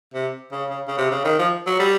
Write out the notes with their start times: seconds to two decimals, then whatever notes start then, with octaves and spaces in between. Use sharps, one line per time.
0.14 C3
0.52 C#3
0.70 C#3
0.88 C#3
0.98 C3
1.11 C#3
1.25 D#3
1.39 F3
1.67 F#3
1.79 G3